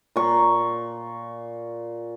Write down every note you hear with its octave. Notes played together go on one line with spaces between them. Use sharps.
A#2 C#6